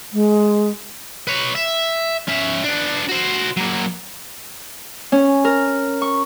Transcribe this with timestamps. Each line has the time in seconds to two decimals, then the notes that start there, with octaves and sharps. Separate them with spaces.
0.13 G#3
1.27 B4 C#5
1.55 E5
2.28 C#4 E5
2.64 B3 D4
3.09 F#4 C5
3.57 F#3 A#3
5.12 C#4
5.44 A#4
6.02 C#6